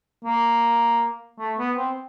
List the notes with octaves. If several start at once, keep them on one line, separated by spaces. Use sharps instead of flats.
A#3
A3
B3
C4